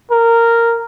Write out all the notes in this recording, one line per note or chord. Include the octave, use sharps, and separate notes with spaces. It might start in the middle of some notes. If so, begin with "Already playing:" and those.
A#4